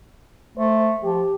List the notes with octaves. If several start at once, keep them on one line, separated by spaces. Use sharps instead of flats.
A3 C5
F3 G4